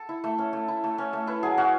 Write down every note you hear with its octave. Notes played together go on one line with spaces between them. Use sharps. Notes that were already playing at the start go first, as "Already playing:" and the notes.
Already playing: A4
E4
A3
C#4
A3
E4
A3
C#4
A3
E4 B4
F#3 G#4
C#4 F#4